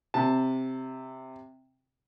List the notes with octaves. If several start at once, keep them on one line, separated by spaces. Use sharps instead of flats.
C3 A5